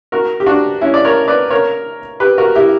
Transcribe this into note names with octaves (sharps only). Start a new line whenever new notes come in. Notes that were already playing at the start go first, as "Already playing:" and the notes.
F#4 A#4
G4
D4 F#4
C#4 E4
D5
A#4 C#5
B4 D5
A#4 C#5
G4 B4
F#4 A#4
E4 G4